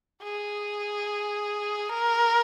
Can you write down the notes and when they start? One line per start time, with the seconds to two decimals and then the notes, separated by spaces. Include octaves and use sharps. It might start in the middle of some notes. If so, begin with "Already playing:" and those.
0.23 G#4
1.89 A#4